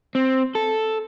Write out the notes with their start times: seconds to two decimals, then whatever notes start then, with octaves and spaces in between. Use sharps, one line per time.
0.15 C4
0.55 A4